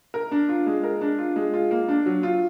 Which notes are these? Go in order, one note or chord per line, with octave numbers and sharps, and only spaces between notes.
A#4
D4
F4
G#3
A#4
D4
F4
G#3
F4
A#3
D4
F#3
F4